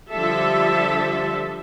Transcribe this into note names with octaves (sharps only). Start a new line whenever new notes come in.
D3 F3 G3 A4 E5